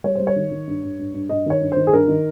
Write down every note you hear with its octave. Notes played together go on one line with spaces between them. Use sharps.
G3 C#5
G3 C5
C#5
D#3
D#3
G2
G2
G2
G2
G2 D#5
D#3 C#5
G2
D#3 C5
G#4
G2 A#4
D#3